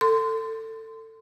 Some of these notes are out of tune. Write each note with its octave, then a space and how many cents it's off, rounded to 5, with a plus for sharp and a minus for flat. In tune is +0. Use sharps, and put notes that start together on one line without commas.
A4 +20 C6 -25